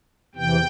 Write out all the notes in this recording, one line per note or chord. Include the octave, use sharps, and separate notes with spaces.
E2 C3 E3 G5